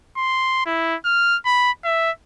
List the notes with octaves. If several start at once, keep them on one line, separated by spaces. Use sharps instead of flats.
C6
E4
F6
B5
E5